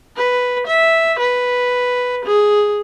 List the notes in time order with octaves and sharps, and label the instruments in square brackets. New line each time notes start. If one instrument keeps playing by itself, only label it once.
[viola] B4
E5
B4
G#4